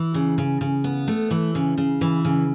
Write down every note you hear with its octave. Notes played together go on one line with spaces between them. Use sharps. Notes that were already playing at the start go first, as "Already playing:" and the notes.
Already playing: E3
C#3
C#3
C#3
B3
A3
E3
C#3
C#3
E3
C#3